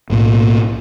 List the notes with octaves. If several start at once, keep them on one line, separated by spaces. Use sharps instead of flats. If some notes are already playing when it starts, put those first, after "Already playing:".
B1 A2 A#3